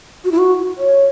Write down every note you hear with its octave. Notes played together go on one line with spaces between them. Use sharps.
F#4
E4
F#4
C#5